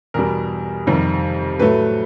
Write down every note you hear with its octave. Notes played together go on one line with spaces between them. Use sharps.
E2 B2 G3 A#4
F2 C3 D#3 G3 A#4
A2 F#3 A3 B4